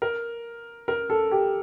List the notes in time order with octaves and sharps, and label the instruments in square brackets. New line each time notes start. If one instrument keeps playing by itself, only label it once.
[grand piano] A#4
A#4
A4
G4